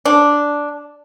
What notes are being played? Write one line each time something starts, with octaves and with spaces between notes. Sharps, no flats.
D4